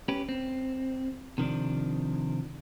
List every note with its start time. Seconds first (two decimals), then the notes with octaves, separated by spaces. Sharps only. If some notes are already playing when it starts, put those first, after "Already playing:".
0.08 C#4 G4 B4
0.29 C4
1.38 C3 D#3 F3 D4